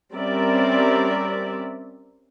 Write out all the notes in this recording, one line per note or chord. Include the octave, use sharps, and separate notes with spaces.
G3 C4 C#4 A#4 D5 E5